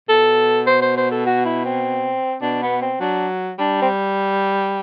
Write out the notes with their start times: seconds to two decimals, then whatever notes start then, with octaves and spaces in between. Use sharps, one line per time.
0.09 B2 A4
0.67 C5
0.82 C5
0.97 C5
1.11 A4
1.26 F#4
1.45 E4
1.65 C4
2.42 B2 D4
2.62 B3
2.82 C4
3.00 F#3 D4
3.59 G3 D4
3.82 C4